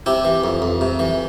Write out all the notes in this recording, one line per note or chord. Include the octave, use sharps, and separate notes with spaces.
C3 E4 G4
E3
F2
F2
C3
E3